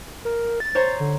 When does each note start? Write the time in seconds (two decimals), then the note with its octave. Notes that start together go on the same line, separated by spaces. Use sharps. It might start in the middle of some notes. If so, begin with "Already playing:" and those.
0.25 A#4
0.60 A6
0.75 C5 C#5 A#5
1.00 D3